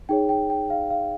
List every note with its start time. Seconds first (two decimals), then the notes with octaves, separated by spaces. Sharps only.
0.09 D#4 G#4 C#5 G5
0.29 G5
0.50 G5
0.70 F5
0.91 F5